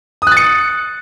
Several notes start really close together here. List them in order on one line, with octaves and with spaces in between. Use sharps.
D#6 F#6 A6 C#7